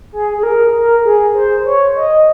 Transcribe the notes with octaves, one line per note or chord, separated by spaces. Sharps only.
G#4
G#4
A#4
A#4
G#4
C5
C#5
D#5